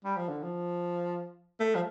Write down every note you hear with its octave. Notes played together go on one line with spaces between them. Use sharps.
G3
F3
D3
F3
A3
F3